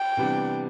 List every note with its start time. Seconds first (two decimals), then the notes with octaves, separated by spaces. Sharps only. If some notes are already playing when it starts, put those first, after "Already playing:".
Already playing: G5
0.17 C3 E3 G3 B3 D4